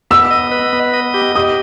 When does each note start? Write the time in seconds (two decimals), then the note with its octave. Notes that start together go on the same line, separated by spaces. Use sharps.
0.11 B3 E6
0.31 D#5
0.52 B4
0.73 B3
0.94 D#5
1.14 G4
1.35 G4 D#6